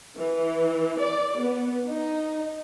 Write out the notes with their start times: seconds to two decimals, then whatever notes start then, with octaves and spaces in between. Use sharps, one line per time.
0.16 E3
0.99 D5
1.36 B3
1.88 D#4